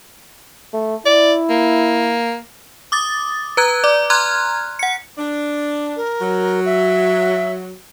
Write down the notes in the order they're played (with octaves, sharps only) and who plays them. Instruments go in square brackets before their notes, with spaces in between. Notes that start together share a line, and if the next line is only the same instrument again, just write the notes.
[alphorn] A3
[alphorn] E4 [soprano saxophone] D5
[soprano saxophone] A#3
[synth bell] D6 D#6 A6
B4 A#5 F#6 G#6
D5 D6
A#5 C6 F6 F#6 G#6
F#5 C#7
[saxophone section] D4
[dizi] A#4
[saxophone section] F#3
[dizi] E5